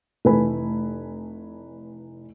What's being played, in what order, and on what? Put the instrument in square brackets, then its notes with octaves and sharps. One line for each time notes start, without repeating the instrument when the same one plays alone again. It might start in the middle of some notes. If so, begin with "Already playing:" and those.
[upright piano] F1 E3 A3 B4 G#5 B5